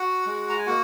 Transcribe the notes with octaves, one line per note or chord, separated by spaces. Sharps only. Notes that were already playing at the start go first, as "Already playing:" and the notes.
Already playing: F#4 F#5
G#3
A#5
G#5
A#3 F#4 F#5